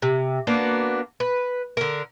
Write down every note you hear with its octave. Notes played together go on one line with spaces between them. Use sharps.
C3
A#3 B3 D4 F#4
B4
D3 A#4